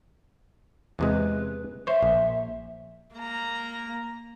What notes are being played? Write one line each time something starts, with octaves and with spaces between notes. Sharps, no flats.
E2 C3 G#3 B4
C5 C#5 E5
A#1
A#3 A#5